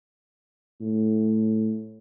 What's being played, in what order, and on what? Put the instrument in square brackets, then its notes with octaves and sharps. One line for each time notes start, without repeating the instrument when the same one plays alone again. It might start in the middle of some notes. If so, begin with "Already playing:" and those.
[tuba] A2